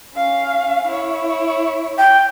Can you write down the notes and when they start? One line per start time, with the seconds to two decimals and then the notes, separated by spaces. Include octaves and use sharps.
0.15 C#4 F5
0.87 E4 C#5
1.98 G5